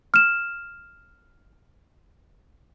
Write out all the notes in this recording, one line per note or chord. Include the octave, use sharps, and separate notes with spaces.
F6 E7